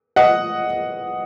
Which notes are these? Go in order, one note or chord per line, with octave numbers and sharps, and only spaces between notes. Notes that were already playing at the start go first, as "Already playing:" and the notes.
D#5 F#5